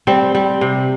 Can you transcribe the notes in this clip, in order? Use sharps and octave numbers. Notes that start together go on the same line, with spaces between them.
G3 C4
G3
C3